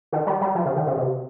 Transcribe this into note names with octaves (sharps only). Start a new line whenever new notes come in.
D#3
G3
G3
F3
C#3
D#3
C#3
C3